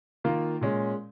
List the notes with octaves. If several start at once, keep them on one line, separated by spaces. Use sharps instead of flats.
D#3 A#3 F4
A#2 G#3 C#4